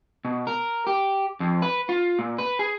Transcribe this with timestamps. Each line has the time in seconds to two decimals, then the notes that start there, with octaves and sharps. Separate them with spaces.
0.25 B2
0.47 A#4
0.87 G4
1.40 F2
1.62 B4
1.89 F4
2.19 A#2
2.38 B4
2.59 G#4